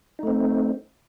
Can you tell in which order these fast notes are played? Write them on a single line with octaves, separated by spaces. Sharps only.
D#4 A3 C4